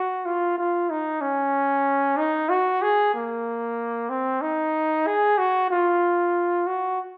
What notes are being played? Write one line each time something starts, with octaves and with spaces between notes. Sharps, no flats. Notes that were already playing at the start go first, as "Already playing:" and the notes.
Already playing: F#4
F4
F4
D#4
C#4
D#4
F#4
G#4
A#3
C4
D#4
G#4
F#4
F4
F#4